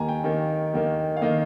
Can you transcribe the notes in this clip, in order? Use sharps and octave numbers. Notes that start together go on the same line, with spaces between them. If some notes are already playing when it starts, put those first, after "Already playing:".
Already playing: D#2 D#3 A#3 G#5 A#5
G5
D#2 D#3 A#3
D#2 D#3 A#3
F5
D#3 A#3 D#5